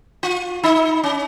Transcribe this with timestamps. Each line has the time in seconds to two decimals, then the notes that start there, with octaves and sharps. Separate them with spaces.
0.23 F4
0.63 D#4
1.04 C#4